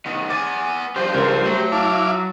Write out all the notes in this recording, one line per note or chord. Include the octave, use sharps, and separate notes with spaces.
D#3 B3
B3 G#5 D6 A6
G2 F3 G4 C5
C#2 A#4 C6
F#3 A3
E4 F5 A5 D6